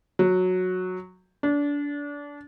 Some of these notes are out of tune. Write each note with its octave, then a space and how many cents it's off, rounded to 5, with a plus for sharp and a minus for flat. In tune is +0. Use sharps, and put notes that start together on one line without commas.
F#3 -10
D4 -25